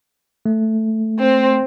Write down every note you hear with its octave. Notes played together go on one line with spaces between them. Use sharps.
A3
C4